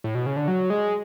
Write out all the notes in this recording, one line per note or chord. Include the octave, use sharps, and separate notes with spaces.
A2
B2
C#3
D3
F#3
G#3